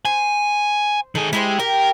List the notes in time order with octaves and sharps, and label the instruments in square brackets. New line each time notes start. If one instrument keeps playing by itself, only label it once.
[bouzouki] C5 [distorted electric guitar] G#5
[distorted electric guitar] D#3 G#4 [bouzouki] A4
[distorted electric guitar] G#3 [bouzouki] E4 G4 C5
[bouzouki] G4 [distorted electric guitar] A#4